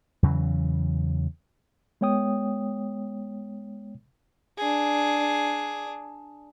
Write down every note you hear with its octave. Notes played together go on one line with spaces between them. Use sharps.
E2 C#3 E3 F#3
G#3 B3 C#5 G5 D#6
D4 G#4